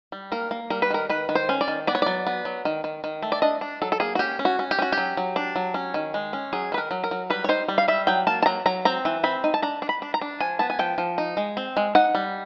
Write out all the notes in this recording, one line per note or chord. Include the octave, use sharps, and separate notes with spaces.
G3
A#3 A#4
A#3
G3 A#4
B4
D#3 A#4
D#3 B4
D#3
C5
C#4
D5
D#3
B3 D5
C#5
F#3 D5
B3
F#3
D#3
D#3
D#3
A3
D5
D4 D#5
D4
F#3 A4
A4
A#3 G#4
F#4
C#4 G4
C#4
F#4
C#4
G4
C#4 F#4
G4
F#3
F#3
D4
F#3
C#4
D#3
G#3
C#4
F#3 G#4
D#3 B4
A#4
F#3
A#4
F#3
G3 B4
C#5
D#4 C5
G3
F5
G3 E5
F#3 G5
A#3 A5
A5
F#3 A#5
F#3 A#5
C4 A#5
E3
C4 B5
D#4
A5
D4 A#5
D4
B5
D4
A#5
D4
F3 G#5
B3 A5
G#5
F3 G5
F3
D#4
G#3
C4
G#3
D#4 F#5
G3